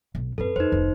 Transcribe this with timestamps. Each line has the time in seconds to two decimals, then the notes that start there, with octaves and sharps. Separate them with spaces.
0.15 B1
0.38 F#2 C4 A4 B4
0.56 F2 D#4 C5
0.72 F1 D#2